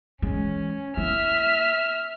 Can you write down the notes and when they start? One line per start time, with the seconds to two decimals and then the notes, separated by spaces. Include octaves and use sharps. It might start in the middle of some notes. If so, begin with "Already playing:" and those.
0.22 E3 G#3 C#4
0.97 A#3 E4 E5 F6